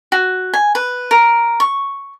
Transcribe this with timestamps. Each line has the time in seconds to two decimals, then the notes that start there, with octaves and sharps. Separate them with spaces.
0.12 F#4
0.54 G#5
0.75 B4
1.11 A#4
1.60 C#6